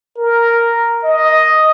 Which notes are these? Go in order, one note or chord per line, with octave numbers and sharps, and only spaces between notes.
A#4
D#5